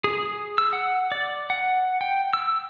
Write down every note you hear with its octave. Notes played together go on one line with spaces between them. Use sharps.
G#4
E6
F#5
D5
F#5
G5
E6